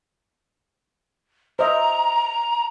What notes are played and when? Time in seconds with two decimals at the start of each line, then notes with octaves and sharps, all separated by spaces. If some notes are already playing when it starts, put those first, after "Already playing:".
1.59 C5 D#5 E5 A#5